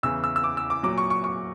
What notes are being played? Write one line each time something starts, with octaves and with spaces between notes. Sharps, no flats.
E2 C#3 E3 E6
E6
E6
D6
E6
D6
A#2 F#3 D6
C#6
C#6
C#6